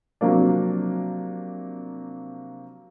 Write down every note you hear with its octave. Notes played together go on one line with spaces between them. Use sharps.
C3 F3 F#3 A#3 D4